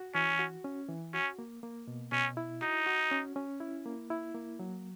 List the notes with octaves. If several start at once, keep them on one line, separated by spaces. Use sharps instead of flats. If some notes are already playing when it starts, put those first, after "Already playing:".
Already playing: F#4
E3 C#4
F#4
C#4
E3
C#4 F#4
A#3
A#3
B2
B2 C#4
E4
D#4 F#4
F#4
C#4
C#4
E4
A#3
E4
A#3
F#3